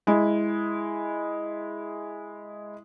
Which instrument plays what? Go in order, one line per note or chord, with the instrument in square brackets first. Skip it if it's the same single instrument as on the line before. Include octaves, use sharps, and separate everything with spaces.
[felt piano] G#3 E4